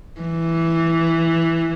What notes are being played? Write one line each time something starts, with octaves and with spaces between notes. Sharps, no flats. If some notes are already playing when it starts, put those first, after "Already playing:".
E3